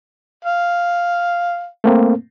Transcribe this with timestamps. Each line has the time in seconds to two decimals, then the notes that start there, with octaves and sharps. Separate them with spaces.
0.45 F5
1.84 A3 A#3 C4